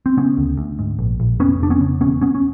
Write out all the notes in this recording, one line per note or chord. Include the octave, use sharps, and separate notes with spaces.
C4
C#3 B3 C#4
D2
D2
G#2
A#1
A#1
F1 B3 C#4
F1 D4
B3 C#4
C#3
E1 B3 C#4
E1 B3 C#4
C#4